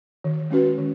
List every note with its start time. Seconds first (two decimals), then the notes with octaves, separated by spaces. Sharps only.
0.24 D#3
0.51 G#3 C#4 F#4 B4
0.78 D#3